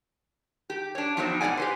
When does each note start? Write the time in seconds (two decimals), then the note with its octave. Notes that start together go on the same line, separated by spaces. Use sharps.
0.70 G4
0.95 D4 C#5
1.17 F3 F#3 B3 C4 D4 D#4
1.41 B2 C4 D5 F#5 G#5
1.57 G4 B4 C5